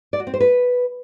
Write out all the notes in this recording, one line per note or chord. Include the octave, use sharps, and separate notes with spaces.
D5
F#4
C4
C5
B4